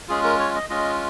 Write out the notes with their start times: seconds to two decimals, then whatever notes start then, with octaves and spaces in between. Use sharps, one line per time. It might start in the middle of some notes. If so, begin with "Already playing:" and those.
0.08 G#3 C#4 F4 G#4
0.24 A#4
0.39 C#5
0.55 D#5
0.69 G#3 C#4 F4 D#5